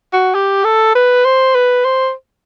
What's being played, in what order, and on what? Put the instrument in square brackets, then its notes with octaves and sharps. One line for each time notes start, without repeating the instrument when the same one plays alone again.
[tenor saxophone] F#4
G4
A4
B4
C5
B4
C5